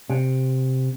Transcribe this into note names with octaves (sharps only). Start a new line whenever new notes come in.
C3